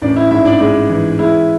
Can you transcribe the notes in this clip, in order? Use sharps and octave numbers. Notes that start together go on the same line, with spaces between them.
A1 D4 D5
E4 E5
G#2 E4 E5
D4 D5
G#3 D4 D5
E3
G#3 E4